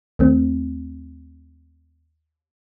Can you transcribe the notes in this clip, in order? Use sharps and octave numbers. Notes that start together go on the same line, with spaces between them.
D#2 A3 C4